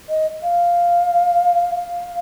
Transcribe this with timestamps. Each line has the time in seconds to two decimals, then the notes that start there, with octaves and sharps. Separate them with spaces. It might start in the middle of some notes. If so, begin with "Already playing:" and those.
0.09 D#5
0.43 F5
1.75 F5